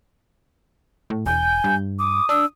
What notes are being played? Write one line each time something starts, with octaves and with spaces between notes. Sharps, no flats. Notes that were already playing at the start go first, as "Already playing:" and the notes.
A2
E1 G#5 G6
G2
D6 D#6
D4 E6